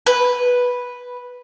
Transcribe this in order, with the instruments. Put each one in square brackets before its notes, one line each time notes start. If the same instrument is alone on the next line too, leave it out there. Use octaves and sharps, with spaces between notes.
[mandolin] B4